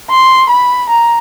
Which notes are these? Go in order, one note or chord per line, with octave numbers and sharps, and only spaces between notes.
C6
B5
A#5